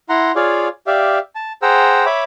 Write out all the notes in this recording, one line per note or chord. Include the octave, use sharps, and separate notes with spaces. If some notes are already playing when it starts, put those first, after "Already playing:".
E4 F#5 A#5 C6
F4 G#4 C#5 D5 F5
G4 D5 E5 F5
A5
G#4 C5 F#5 G5 A#5 E6
C#5 E5 B5 D6